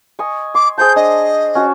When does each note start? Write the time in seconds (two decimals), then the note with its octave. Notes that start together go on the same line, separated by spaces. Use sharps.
0.19 D#5 G#5 C#6
0.54 C6 D6
0.78 G#4 C5 A5 G6
0.96 D4 D#5
1.55 C#4 F#4 A5